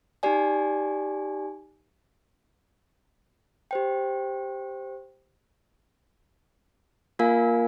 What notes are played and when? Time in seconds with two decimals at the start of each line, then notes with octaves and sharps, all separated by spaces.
0.23 D#4 G4 D5 G#5
3.71 G4 C5 G5
7.19 A#3 F4 A#4 F5 G#5